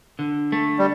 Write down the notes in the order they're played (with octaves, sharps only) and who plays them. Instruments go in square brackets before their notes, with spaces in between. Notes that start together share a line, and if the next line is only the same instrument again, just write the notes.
[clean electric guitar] D3
A3
[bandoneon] G3